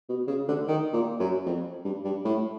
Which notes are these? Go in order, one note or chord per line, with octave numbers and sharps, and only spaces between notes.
B2
C#3
D3
D#3
A#2
F#2
F2
G2
G2
A2